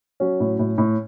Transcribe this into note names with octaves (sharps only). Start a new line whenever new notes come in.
F#3 C#4
A2
A2
A2